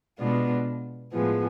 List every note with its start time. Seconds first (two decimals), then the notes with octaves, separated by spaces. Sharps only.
0.19 B2 G#3 B3 D4 F4
1.12 A2 F3 G#3 B3